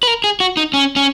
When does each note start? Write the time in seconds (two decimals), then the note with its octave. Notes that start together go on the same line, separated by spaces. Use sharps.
0.03 B4
0.07 A#4
0.24 G#4
0.40 F#4
0.57 D#4
0.73 C#4
0.96 C#4